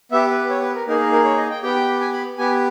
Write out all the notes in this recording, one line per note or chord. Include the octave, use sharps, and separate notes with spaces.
B3 G4 E5
B4
C#5
B4
A#4
A#3 D#4 G#4 A#4
A#4
A#4
C#5
D#5
G5
B3 G4 G5
G#5
B5
B3 G4 G#5